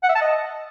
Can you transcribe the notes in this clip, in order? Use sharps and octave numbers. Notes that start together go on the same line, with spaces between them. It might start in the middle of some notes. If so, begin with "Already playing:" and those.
F#5
E5
A5
D#5